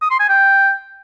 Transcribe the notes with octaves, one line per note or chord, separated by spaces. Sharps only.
D#6
C6
G#5
G5